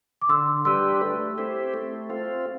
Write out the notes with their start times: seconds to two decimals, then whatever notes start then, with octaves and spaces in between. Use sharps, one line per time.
0.22 D6
0.29 D3 C6 E6
0.65 G3 D4 G4 B4 C6 E6
1.01 A3
1.38 C4 E4 G4
1.74 A3
2.09 C4 F4